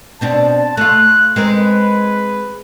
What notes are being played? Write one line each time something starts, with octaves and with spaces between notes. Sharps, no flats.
B2 C4 D4 A5
A3 F4 F#6
G#3 C4 A#4 B4